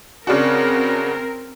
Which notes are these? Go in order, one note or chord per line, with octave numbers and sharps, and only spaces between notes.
C#3 C4 D4 F#4 A#4